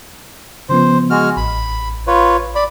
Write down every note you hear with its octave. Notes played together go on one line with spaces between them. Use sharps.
C#3 F3 B3 C5
G#3 F#4 F6
A1 B5
F4 B4 C#5
D5 B5